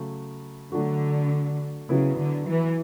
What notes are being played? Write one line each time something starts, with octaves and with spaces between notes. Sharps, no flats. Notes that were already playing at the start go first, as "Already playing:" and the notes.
Already playing: C#3 F#3 A3
D3 F#3 A3 D4 F#4 A4
C#3 F#3 B3 E4
D3
E3